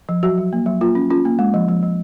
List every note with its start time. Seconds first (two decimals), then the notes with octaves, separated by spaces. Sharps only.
0.09 F3
0.23 F#3 F#4
0.38 F#3
0.53 A#3
0.66 F#3
0.81 A#3 F4
0.95 C#4
1.10 C#4 F4
1.25 A#3
1.39 G#3
1.54 F3
1.69 F3
1.83 F3